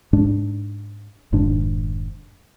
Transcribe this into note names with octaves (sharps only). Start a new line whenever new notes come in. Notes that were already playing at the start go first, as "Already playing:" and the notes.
G#2 G#3 D4
F1 G#2 D#3 D4